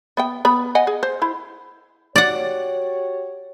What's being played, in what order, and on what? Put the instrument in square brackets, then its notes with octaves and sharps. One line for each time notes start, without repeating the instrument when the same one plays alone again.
[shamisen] B3 E5 G5
B3 B5
D#5 F#5 G#5
G#4
C5
E4 C5
[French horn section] F#4 G4 C#5 [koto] D5 F#5